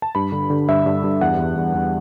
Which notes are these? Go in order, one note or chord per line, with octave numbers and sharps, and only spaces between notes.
A5
G2 B5
D3
D3
G2 E5
G2
G2
E2 F#5
E2
E2
E2